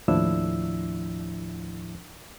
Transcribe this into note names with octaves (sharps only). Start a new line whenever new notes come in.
D#2 A2 F3 D4 E4 E6